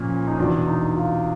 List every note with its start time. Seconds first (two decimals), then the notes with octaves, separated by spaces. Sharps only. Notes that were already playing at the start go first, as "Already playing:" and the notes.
Already playing: A#2 F3 C#4
0.27 D#4
0.37 E2 B2 D4
0.67 D#4
0.96 F4